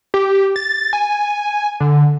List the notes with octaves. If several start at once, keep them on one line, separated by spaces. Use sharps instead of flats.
G4
A6
G#5
D3